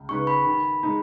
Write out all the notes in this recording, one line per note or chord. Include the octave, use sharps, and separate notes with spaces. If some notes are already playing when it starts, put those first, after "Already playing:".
Already playing: C#2
C#3 G#3 D#4 B4 C#6
B5
D#3
G#3 D#4